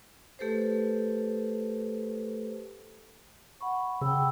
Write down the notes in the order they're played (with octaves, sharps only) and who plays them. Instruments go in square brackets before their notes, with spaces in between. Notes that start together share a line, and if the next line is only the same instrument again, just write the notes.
[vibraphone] A3 G4 A4 B4 C5
F#5 B5 C#6
[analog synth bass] C#3 [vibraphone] G5 B5 E6